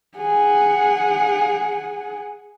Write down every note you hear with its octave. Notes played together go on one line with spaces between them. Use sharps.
G#4 F#5